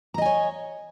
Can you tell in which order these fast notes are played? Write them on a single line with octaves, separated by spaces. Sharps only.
A#5 D#5 G#5 C#5